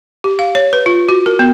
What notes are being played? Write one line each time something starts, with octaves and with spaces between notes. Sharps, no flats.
G4
F5
C#5
B4
F4
F#4
A#4
B3